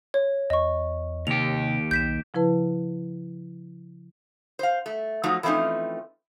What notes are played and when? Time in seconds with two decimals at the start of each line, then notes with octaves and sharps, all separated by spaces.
0.14 C#5
0.50 E2 D#5 C#6
1.27 D#2 C3 G4 F7
1.91 B1 G6 B6 E7
2.34 C#3 F3 E4 B4 A5
4.59 C5 F5
4.86 A3
5.23 F3 F#3 A3 D#4
5.43 E3 F3 A3 C4 C#4 D#4